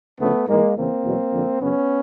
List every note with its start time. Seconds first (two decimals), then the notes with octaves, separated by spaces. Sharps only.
0.20 D2 C#3 F3 A3 B3
0.47 G#2 E3 G#3 A#3
0.76 E2 C#3 E3 A#3 C4
1.04 E2 B2 F#3
1.32 F2 D3 F3
1.61 F#2 C#3 F#3 B3 C#4